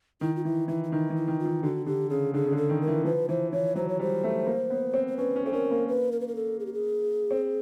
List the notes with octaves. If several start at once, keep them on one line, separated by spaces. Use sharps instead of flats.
D#3 E4
F4
E3 E4
E3 E4
E4
D#3 D#4
E3
E4
D#3
F4
D#3
D3 F#4
D3 G4
C#3 G#4
D3 G#4
C#3
D3
A4
D#3
A#4
E3
F3 B4
E3 C5
E3 C#5
F#3 C5
C#5
G3 C5
A3
A#3
B3
C4
C5
C#4 B4
C#4
C4 A4
C#4 A#4
A#3
B4
A#4
B4
A#4
A4
G#4
G4
G#4
C4